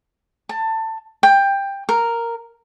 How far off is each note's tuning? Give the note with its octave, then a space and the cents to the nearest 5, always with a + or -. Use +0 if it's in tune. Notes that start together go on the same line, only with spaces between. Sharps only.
A5 +20
G5 +15
A#4 -5